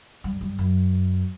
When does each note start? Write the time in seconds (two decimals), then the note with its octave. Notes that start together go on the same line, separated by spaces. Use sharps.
0.24 G2
0.41 G2
0.59 F#2